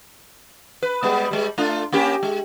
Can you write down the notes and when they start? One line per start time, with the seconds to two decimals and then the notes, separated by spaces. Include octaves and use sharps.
0.83 B4
1.03 G3 G#3 B3
1.31 G3 G#3
1.58 A3 D4 F4
1.92 A#3 C#4 G4
2.23 G#3